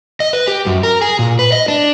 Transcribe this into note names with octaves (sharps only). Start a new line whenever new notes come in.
D#5
B4
G4
F#2
A#4
G#4
A#2
B4
D#5
D4